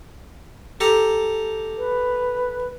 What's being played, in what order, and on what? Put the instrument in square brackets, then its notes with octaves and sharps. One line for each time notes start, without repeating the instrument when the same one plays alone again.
[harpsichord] G4 A4 A#5
[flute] B4